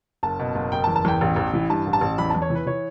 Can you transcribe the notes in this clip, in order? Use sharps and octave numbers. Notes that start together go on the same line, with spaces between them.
F#1 A5
B2
F#1
F#1 G5
A5
E2
A5
E2 G5
A1
A1
E3
G2 A5
A1
A5
A1
E2 B5
E2 A5
C#5
E3
B4
E3 C#5